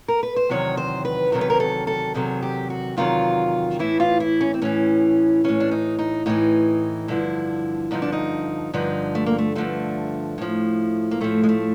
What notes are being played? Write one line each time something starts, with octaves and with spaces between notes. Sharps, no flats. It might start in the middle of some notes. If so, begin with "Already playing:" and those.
A#4
B4
C5
E2 C3 D#3 F#3 C#5
C5
B4
E2 C3 D#3 F#3 A#4
B4
A#4
A4
A4
E2 C3 D#3 F#3 G#4
G4
F#4
E2 C3 D#3 F#3 F4
A2 E3 E4
F4
E4
C#4
C4
A2 E3 C#4
A2 E3 C#4
D4
D#4
D#4
A2 E3 D#4
G2 D3 F3 E4
G2 D3 F3 D#4
D4
D#4
G2 D3 F3 D#4
A3
A#3
A3
G2 D3 F3 A3
A2 F3
A#3
A2 F3 A3
G#3
A3